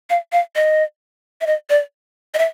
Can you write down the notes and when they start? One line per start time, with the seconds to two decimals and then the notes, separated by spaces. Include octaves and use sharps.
0.10 F5
0.32 F5
0.56 D#5
1.41 E5
1.47 D#5
1.70 D5
2.34 D#5
2.39 E5